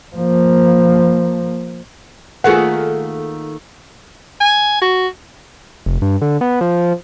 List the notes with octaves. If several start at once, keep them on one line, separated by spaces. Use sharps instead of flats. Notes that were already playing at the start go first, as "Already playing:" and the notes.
F3 A#3
D#3 A3 A#3 F4 G#4 B4 F#5
G#5
F#4
F1
G2
D3
B3
F3